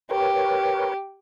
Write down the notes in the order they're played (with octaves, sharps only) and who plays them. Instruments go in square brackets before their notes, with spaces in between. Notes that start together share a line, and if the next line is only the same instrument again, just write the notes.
[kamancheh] G4 [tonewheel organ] A#4 B4 C#5